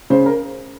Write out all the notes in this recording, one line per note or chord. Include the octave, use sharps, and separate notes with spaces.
C#3 C5
A#4